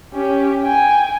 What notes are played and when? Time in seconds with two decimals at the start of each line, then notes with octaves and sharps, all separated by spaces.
0.14 C#4 G4
0.63 G5 G#5